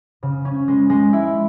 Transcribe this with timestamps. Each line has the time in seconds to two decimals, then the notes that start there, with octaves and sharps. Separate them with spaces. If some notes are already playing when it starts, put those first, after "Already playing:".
0.23 C#3
0.45 C#4
0.68 G#3
0.90 G#3
1.13 E4